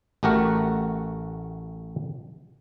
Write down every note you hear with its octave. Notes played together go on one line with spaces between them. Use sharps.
A1 A3 F#4 G4 A#4 F#5